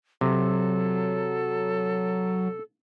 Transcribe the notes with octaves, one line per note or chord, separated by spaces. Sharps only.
C3 F#3 A4